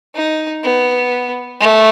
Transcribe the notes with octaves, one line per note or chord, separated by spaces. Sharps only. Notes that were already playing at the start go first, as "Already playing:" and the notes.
D#4
B3
A3